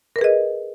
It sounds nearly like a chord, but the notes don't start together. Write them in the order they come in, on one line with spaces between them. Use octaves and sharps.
A#4 B4 G#4 D#5